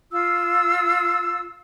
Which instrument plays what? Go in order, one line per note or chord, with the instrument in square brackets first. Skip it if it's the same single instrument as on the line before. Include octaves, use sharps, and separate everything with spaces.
[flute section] F4 E6